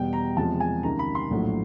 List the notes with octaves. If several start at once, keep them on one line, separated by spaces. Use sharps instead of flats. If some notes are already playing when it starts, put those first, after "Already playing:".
Already playing: E2 B2 G3 G5
A#5
E2 C3 F3 G#3 A5
G#5
C#2 C3 D#3 A#5
B5
C6
A#1 A2 F#3